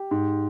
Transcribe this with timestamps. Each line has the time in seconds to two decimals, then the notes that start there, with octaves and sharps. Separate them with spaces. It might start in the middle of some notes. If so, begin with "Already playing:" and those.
Already playing: G4
0.11 G#2